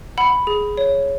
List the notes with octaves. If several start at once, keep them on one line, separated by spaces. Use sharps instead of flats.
F#5 B5
G#4
C#5